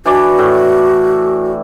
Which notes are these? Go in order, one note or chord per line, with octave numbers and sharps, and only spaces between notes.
E3 D4 F#4 D5
A2